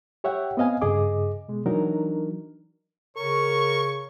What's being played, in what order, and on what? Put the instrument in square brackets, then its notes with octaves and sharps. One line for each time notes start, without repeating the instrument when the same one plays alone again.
[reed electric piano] G4 C#5 E5 F#5 G5
B3 C4 D#5 F5 G#5
G2 C#3 G#4 D#5 D6
B2 G#3
E3 F#3 D4 D#4 A#4
[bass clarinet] C#3 [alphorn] A#4 [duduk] C#5 [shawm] C#6